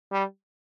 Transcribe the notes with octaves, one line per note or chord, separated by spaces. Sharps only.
G3